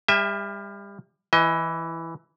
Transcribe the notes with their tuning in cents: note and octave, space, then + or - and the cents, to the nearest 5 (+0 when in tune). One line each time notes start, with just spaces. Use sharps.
G3 +30 E5 +0 G#5 -40
E3 +0 D#5 +30